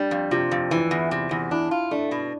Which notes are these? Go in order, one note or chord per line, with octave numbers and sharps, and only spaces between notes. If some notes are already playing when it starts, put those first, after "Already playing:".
Already playing: G3 D4
F2
C3 F4
F2
E3 E4
E2
C3
E2
D4 E4
F4
A3 D4
B2